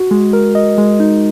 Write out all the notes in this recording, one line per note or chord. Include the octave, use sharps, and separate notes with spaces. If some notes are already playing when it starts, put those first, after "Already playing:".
Already playing: F#4
G#3
A#4
D#5
G#3
D#4